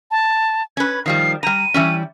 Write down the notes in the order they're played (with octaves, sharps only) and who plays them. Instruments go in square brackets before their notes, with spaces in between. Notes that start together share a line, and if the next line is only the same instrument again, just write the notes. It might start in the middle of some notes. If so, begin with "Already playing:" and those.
[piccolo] A5
[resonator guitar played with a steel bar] C#4 B4 [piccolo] G#6
[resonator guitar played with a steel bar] D#3 F3 G3 [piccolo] C7
[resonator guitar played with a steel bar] G3 A#5 [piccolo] D#7
[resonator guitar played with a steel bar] E3 G3 C#4